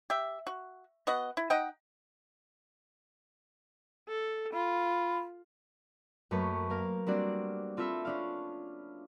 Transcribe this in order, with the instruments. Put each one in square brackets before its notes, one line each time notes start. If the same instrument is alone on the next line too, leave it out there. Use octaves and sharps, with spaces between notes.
[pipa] G4 E5
F#4
B3 F#4 D#5 F#5
E4
D#4 D#5 F#5 G5
[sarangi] A4
[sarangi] F4 [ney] B5
[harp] F#2 A3 A#3 B4 C#5 A5
A#3 A#4 F5
G3 A#3 C4 D4 F#4 D5
C4 F4 A4 E5 B5
C#4 D4 F5